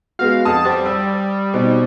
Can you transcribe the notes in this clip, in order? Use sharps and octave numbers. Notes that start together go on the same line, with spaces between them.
G#3 B3 F#4 F5
F2 F#5 A5 D#6
G3 C5
D5 E6
B2 C4 D#4